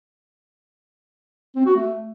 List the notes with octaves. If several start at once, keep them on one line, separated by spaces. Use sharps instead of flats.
C4
F#4
A3